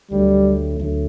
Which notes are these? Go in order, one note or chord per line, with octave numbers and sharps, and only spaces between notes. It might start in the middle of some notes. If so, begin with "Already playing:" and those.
D2 D3 F#3 G3 A3
D2 D3 F#3 A3